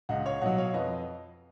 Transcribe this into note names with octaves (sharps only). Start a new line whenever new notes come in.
C#2 D#5 F#5
C#5 F5
B2 F#3 D#5 F#5
C#5 F5
F2 B4 D#5